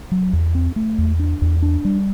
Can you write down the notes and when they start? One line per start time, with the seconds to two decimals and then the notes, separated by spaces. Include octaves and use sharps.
0.11 F#3
0.33 E2
0.55 C4
0.76 A3
0.98 E2
1.19 D4
1.42 E2
1.62 D4
1.85 G3